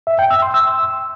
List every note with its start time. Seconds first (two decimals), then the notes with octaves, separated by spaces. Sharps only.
0.07 E5
0.19 G5
0.31 E6
0.42 C6
0.54 E6